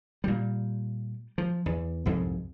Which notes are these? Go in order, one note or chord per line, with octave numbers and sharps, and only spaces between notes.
A#2 G3
F3
E2
C2 F2 G#2